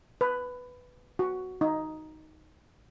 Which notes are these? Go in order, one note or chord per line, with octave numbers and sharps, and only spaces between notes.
B4
F#4
D#4